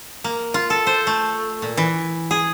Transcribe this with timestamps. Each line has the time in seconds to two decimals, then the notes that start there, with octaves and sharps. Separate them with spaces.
0.24 A#3
0.54 F4
0.70 A4
0.87 C5
1.07 A3
1.62 A#2
1.77 E3
2.31 G#4